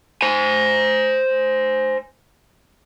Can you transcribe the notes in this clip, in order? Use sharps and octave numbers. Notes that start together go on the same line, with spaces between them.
C5 G#5